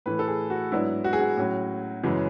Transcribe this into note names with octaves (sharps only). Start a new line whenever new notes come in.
A2 E3 A3 B4
A4
G#4
F#4
G#2 F#3 B3 D4 E4
F#4
G#4
F#4
A2 F#3 C#4
F#2 C#3 E3 G#3